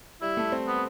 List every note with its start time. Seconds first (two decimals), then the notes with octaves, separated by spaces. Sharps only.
0.22 G3 E4
0.37 A3
0.52 C4
0.67 B3